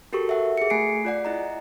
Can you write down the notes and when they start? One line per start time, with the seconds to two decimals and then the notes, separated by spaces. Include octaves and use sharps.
0.13 F#4 G4 A4 A#4 C#6
0.29 E5 F#5
0.58 G#4 C#7
0.70 A3 G#5 C7 D7
1.05 F4 D5 F#5
1.25 E4 D#5 A#5